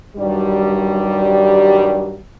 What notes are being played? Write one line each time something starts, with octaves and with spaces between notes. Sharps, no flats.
G2 D#3 F#3 G3